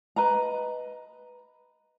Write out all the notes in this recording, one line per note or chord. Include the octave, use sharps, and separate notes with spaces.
B4 D#5 A#5